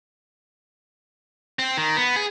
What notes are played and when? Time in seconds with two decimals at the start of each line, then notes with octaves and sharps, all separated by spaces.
1.59 C4
1.77 D#3
1.96 B3
2.16 G#4